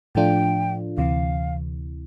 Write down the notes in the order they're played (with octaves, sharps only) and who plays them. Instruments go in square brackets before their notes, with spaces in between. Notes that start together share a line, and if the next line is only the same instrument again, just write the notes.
[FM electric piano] A2 F3 A3 D4 F4 [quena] G5
[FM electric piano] D2 C3 E3 [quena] F5